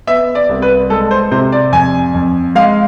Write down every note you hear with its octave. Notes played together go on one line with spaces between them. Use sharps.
B3 E5
D5
C2
B4
G#3 A4
C5
C3 C5
D5
F2 G#5
F2
G#3 F5